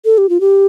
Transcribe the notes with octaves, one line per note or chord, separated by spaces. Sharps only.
A4
G4
F4
G4